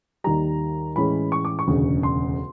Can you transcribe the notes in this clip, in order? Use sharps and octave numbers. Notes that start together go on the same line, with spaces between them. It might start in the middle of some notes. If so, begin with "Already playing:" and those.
D#2 D#3 G3 A#5
A2 E3 G#3 C#4 B5
C#6
D6
C#6
E1 D2 C#3
C6